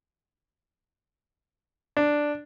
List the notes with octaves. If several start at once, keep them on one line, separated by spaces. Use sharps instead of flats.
D4